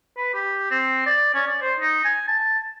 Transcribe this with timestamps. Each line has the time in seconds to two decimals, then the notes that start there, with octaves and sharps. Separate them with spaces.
0.17 B4
0.34 G4
0.71 C4
1.06 D5
1.34 C#4
1.47 D5
1.61 C5
1.80 D#4
2.05 G#5
2.28 A5